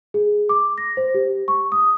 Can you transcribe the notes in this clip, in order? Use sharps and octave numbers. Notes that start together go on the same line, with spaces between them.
G#4
D6
A#6
C5
G4
C#6
D#6